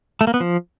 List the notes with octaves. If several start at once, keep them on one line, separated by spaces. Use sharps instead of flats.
A3
A#3
B3
F3